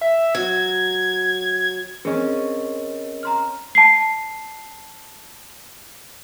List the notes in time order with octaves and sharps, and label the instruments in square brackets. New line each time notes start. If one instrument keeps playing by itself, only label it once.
[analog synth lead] E5
[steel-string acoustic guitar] F#3 [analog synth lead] G#6
[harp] C4 C#4 [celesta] G#4 [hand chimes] A#4 D#5
[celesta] A#5 C6 F6
A5 C7